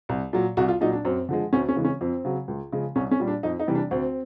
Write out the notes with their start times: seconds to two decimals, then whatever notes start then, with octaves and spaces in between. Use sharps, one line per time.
0.09 C2
0.33 A#2 F#3
0.57 C2 F#4
0.68 F4
0.81 A#2 F#3 D#4
0.93 D4
1.05 F#2 C4
1.29 D3 F3 G#3
1.53 D2 C#4
1.69 C#4
1.76 C#3 E3 G#3
1.85 C#4
2.01 F2 C4
2.25 C#3 F#3
2.48 C#2
2.72 C#3 F3 G#3
2.95 C2 C#4
3.11 C#4
3.20 A#2 G3
3.27 D4
3.43 F2 D#4
3.60 D#4
3.67 C3 E3 G3
3.75 D4
3.91 D2 C4